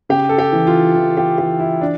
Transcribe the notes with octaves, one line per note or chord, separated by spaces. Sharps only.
C#3 G4
A4
G4
E3
F4
E3
G4
E3 G4
E4
D4